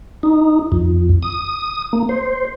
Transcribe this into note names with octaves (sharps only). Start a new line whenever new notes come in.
D#4
F2
D#6
A#3
C5